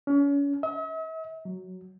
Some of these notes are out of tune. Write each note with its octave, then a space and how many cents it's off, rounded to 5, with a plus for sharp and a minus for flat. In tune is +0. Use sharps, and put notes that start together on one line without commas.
C#4 +35
E5 -45
F#3 +5